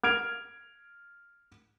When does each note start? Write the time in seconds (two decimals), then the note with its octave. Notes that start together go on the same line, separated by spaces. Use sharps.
0.04 F6 G#6 D7 F7